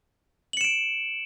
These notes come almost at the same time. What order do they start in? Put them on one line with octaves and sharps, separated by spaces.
F#7 C#7 E7 D7